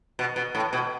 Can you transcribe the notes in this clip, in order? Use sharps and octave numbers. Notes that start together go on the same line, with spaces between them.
B2
B2
A2
B2